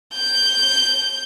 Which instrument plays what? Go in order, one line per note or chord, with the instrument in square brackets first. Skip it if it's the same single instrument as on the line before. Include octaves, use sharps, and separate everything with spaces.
[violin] G6